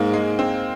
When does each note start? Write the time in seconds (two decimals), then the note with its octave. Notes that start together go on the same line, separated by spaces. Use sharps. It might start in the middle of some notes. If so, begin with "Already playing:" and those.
Already playing: G#2 A#3
0.13 G#3
0.39 C4